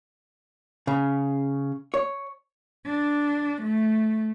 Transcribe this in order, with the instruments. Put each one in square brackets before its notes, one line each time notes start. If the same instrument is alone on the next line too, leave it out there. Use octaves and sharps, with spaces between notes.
[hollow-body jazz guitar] C#3
C#5
[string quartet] D4
A3